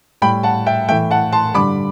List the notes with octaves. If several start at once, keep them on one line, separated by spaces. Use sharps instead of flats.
A2 G3 G5 B5
F#5 A5
E5 G5
A2 E3 A3 E5 G5
F#5 A5
A5 C6
G2 D3 G3 B5 D6